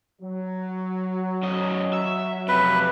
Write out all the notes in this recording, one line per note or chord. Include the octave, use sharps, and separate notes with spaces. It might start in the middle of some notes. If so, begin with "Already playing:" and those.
F#3
F#2 D#5
E5
F2 C3 B4